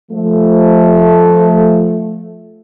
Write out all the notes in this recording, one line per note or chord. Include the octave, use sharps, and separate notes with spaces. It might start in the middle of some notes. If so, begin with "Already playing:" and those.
F3 A3